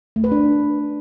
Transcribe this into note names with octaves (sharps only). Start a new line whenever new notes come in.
A3
B4
D4